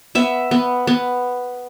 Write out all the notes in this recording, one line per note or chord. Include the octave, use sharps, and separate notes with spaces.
B3 E5
B3
B3